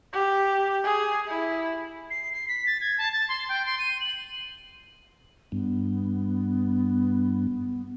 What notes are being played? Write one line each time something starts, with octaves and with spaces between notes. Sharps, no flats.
G4
G#4
E4
C7
C7
B6
A6
G#6
A5
A6
C6
G5
C6
D#7
F#7
G2 B3